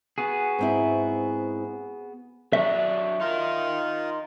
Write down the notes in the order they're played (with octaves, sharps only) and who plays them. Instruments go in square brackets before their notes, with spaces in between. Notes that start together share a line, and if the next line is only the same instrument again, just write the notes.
[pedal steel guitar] B3 F#4 G#4
[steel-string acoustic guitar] G#2 C4 E4
[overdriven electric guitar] F#3 D4 [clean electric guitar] E5
[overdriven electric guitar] D#4 A#4 [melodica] F4